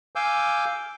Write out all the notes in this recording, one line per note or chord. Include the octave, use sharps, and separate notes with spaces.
F5 G#5 D6 E6 G6